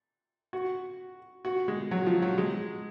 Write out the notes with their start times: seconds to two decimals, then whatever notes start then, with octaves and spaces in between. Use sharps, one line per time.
0.53 F#4
1.45 F#4
1.68 G#3
1.91 F#3
2.06 F3
2.22 F#3
2.38 G#3